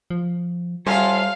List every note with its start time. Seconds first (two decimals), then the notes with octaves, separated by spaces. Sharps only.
0.10 F3
0.87 F#3 G3 F4 A4 C5 E5 F5 G#5